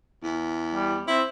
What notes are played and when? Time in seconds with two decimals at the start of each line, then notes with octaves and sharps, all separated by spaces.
0.23 E2
0.74 G3
1.08 C4 E4